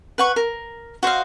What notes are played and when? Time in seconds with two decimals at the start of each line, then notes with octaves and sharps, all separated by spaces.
0.18 B4 F#5 C#6
0.36 A#4
1.03 F#4 C5 D#5 F5